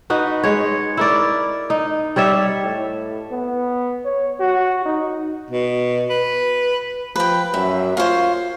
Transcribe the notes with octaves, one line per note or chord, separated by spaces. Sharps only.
D#4 F#4 B4
G#3 C#5
E4 A#4 D5
D#4
G3 C#5 D5 E5
A2
B3
C#5
F#4
D#4
B2
B4
F3 B4 G5
F#2 E5
F4 C5 C#5 F5